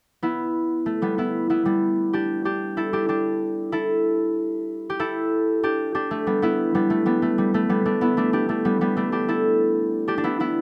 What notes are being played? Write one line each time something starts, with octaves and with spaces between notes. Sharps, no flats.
B3 E4
A3
G3 B3
B3 E4
B3 E4
G3 B3
D4 G4
D4 G4
E4 A4
D4 G4
D4 G4
E4 A4
G4
E4 A4
D4 G4
D4 G4
A3
G3 B3
B3 E4
G3 B3
A3
G3 B3
A3
G3
A3
G3 B3
A3 D4
B3 E4
A3 D4
D4 G4
A3 D4
G3 B3
G3 B3
A3 D4
D4 G4
E4 A4
D4 G4
D4
B3 E4
B3 E4